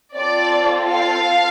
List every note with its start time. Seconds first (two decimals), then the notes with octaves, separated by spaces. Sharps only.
0.16 C4 F4 A4 D5
0.89 F5